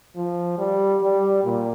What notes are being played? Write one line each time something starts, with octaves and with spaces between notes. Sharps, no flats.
F3
G3
G3
A#2